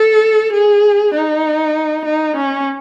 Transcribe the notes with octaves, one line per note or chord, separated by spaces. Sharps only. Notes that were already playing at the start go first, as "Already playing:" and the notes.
Already playing: A4
G#4
D#4
D#4
C#4